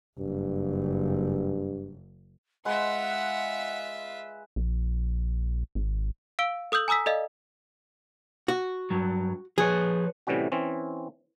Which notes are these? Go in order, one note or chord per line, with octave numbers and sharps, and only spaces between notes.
F#1 G2
G#3 F4 B4 E5 F#5
A#1
G#1
F5 E6 D7 G7
A4 D#6 E6 G6 F#7
G#5 A#5 D#6 E6 B6
A4 D5 D#5 F5
F#4
G2 F#3
F3 G#4 B4 C#5
A2 C3 E3 G3 C#4 F#4
E3 C4 C#4